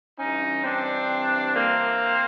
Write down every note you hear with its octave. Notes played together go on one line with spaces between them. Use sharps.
G2 E3 C#4 D#4
C4 D4
A#3 C4